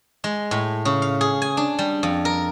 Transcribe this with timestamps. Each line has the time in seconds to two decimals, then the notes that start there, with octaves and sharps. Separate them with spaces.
0.24 G#3
0.51 A2
0.85 C#3
1.02 F5
1.21 G#4
1.42 G#5
1.57 D4
1.79 G3
2.03 F2
2.25 A#4